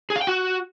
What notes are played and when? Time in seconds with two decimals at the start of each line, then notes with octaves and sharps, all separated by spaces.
0.10 G#4
0.16 F5
0.21 G5
0.27 F#4